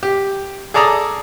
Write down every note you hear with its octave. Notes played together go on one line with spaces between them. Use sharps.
G4
G#4 A4 D5 A#5 D#6